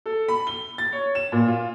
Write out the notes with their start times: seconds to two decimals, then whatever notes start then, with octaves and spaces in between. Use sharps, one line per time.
0.06 A4
0.28 B5
0.47 G7
0.78 A6
0.92 C#5
1.15 E7
1.32 A#2
1.48 F4